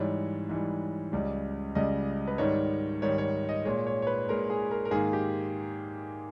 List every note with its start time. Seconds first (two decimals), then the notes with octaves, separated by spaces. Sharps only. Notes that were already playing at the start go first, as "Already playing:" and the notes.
Already playing: G#2 E3 G3 C#5
0.49 G#2 E3 G3
1.12 C#2 C#3 G3
1.75 C#2 C#3 G3 D#5
2.27 B4
2.38 G#2 D#3 G3 C#5
3.02 G#2 D#3 G3 C#5
3.18 C#5
3.49 D#5
3.65 A#2 G#3 C#5
3.87 C#5
4.02 C#5
4.07 B4
4.28 A#2 G#3 A#4
4.50 G#4
4.71 A#4
4.85 A#4
4.91 G#2 D#3 A#3 G#4
5.13 G4